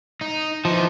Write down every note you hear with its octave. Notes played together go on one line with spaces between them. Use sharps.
D#4
E3 F3 D#4